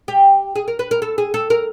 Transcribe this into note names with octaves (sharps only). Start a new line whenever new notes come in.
G4
G#4
A#4
B4
A#4
A4
G#4
A4
A#4